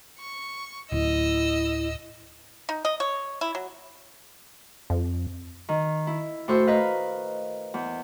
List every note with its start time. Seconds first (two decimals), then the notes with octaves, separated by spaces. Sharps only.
0.20 C#6
0.92 D1 E4 D#5 E6
2.69 D#4
2.85 D#5
3.00 C#5
3.41 E4
3.55 F#3
4.90 F2
5.69 D#3
6.07 E4
6.48 A2 F#4 C5 C#6 E6
6.67 A#4 B4 D#5 F5
7.74 E2